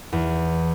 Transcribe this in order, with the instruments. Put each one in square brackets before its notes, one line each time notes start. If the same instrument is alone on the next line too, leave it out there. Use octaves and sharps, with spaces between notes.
[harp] E2